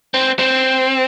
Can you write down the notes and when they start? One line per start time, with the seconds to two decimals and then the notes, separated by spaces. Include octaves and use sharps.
0.14 C4
0.39 C4